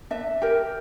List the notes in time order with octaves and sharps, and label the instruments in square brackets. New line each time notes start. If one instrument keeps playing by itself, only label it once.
[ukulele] D4 E5
G4 A#4